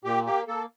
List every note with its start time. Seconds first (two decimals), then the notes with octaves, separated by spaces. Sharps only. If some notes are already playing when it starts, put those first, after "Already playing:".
0.04 A#2 G4
0.26 A#3 G4
0.48 A#3 A4